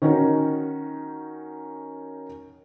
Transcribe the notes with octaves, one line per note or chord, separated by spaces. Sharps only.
D#3 C#4 D#4 F#4 A#4